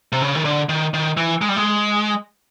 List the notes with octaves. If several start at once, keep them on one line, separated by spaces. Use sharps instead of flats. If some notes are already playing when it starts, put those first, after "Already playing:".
C3
C#3
D#3
D3
D#3
D#3
E3
G#3
G3
G#3